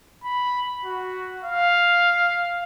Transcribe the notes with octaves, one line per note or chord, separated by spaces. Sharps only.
B5
F#4
F5